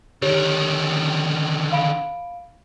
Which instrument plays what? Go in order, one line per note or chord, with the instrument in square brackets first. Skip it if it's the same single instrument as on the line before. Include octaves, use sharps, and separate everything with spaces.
[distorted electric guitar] D3 D#3 [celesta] G4 C#5
[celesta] F5 B5 D7